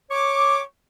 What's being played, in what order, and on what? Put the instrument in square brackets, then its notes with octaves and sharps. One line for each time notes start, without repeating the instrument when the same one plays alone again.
[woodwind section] C#5 C#6 D6